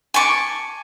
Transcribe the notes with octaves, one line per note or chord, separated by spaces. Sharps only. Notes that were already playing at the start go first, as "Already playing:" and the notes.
G#5 A5 C#6 D6